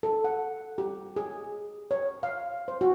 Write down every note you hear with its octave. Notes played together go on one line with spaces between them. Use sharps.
A4
F#5
G4
G#4
C#5
F5
C5
F#4